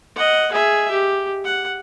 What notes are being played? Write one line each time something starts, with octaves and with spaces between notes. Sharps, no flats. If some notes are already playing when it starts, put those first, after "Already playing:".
D#5 F#5
G#4 E5
G4
F#5